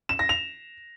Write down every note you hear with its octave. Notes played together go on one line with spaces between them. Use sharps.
E7
A#6
F7